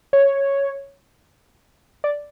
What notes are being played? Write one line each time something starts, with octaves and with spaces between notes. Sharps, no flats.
C#5
D5